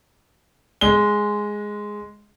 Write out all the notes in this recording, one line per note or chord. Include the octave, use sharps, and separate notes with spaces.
G#3 G7